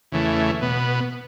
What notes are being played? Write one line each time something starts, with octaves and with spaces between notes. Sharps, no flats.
E2 C#3 E3 A3
B2 B3